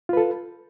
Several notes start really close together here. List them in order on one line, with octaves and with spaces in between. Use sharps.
F4 B4 A4